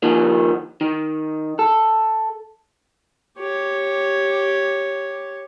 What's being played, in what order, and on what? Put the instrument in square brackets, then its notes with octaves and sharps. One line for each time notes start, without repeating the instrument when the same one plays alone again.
[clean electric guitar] D#3 F3 A#3
D#3
A4
[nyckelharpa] G4 C#5